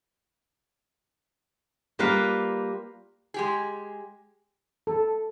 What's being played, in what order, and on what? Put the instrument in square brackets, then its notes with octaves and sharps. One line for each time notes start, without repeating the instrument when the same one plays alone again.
[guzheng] G3 A#3 F4 B4 F5
[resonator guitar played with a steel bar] G#3 G4 G#4
[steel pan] A4